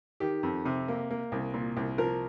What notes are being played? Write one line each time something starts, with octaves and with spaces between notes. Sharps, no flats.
D#3 G4
F2
C3
A#3
A#3
C2
A#2
C2
F3 A#4